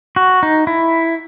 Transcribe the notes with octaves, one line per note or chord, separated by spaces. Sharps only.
F#4
D#4
E4